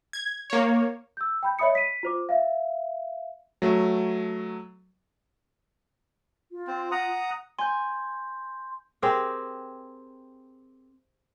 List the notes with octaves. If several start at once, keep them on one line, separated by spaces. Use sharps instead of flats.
G#6
A#3 C#5
E6 G6
G5 B5 G6
C#5 D#5 E5 B5 D#6 C#7
B6 D#7
F4 C5 D6
E5 F5
F#3 A3
F4
C4
F#5 A#5 D#6
G#5 C6 G6
C4 G4 G#4 A#4